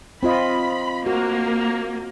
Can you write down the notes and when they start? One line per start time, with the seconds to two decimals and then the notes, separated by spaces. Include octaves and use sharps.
0.23 C4 F4 D#5 B5
1.06 A#3 F#4